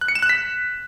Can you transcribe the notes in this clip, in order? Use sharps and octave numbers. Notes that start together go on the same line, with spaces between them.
F#6
C#7
E7
F#6
B6